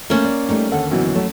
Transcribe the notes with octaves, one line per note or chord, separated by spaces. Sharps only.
A3 A#3 C#4 C5
D5
G3 A3 D#4
D#2 D3 A4 F#5
F#2 B2 E3
F#3 A3 A5